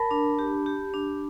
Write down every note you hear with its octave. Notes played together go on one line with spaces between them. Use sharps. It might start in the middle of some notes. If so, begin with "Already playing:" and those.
Already playing: A#4 A5 B5
D4
G4
G4
D4